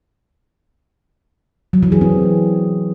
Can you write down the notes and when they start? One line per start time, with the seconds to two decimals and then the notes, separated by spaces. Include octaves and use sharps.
1.73 F#3
1.83 E3
1.92 G#4
2.01 C4